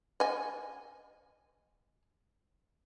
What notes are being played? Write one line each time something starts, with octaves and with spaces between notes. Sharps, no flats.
D#5 G#5